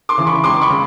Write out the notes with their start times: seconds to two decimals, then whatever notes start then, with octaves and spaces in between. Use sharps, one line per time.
0.09 C6 D6
0.18 C#3 E3
0.27 B5 C#6
0.44 C#2 C6 D6
0.61 B5 C#6
0.70 C#3